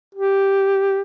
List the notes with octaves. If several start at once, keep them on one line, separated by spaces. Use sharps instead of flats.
G4